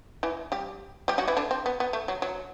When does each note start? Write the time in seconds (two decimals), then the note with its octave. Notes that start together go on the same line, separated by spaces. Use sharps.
0.23 E3 E4
0.52 G3 G4
1.08 G3 G4
1.18 F#3 F#4
1.28 E3 E4
1.37 D3 D4
1.51 C4
1.66 B3
1.80 B3
1.93 A3
2.08 F#3
2.22 F#3